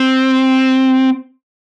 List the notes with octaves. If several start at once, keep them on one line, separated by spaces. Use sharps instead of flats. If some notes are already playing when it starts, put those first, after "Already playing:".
Already playing: C4